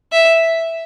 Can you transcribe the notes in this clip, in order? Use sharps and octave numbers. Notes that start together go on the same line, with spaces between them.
E5